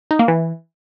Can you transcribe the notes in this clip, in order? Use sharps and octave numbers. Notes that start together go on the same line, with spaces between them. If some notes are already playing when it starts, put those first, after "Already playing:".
D#4
A#3
E3